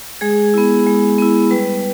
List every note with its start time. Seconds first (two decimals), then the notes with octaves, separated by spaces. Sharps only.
0.21 G#3 G#4
0.54 B3 E4
0.86 G#3
1.18 B3 E4
1.51 G3 B4